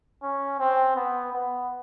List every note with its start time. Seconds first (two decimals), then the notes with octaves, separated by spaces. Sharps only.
0.22 C#4
0.59 C4
0.96 B3
1.33 B3